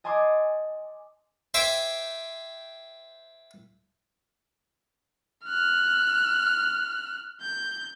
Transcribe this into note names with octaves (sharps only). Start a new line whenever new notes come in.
D#5 G#5 A5 C6 D6 D#6
C5 E5 G5 G#5 D6
F6 F#6
G6